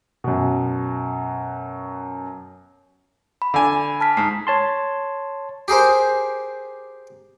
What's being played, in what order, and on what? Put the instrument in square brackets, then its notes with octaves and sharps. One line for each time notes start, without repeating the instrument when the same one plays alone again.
[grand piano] F#2 B2
[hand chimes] B5
[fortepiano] D3 G#5
[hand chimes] A5 F6 B6
[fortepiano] G#2 [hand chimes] C7
[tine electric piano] C#5 A5 C6
[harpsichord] G4 G#4 A#4 C5